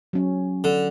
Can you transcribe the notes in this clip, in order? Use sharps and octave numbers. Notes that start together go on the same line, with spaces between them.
F#3 C#4
D3